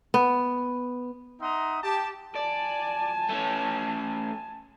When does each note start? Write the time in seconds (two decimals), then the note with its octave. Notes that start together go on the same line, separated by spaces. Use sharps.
0.14 B3
1.41 D#4 E5 F#5 A#5 C6 D#6
1.83 G4 A5
2.35 D5 G#5 A5
3.29 A3 C#4